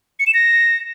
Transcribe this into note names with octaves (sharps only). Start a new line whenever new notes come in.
C#7
E7
A#6